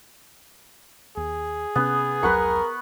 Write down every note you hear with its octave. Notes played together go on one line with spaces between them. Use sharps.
D#2 G#4
C3 B3 C#4
F1 C#2 F#3 A#4 B4 F#5 C#6